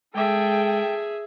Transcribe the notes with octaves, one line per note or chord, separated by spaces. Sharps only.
G#3 G#4 A4 E5 G5